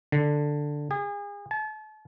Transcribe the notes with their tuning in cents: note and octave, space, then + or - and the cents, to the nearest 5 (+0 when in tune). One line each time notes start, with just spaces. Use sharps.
D3 +5
G#4 -35
A5 -35